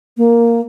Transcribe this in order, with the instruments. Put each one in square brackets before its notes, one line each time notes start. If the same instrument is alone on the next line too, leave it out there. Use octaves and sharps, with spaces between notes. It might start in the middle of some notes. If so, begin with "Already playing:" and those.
[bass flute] A#3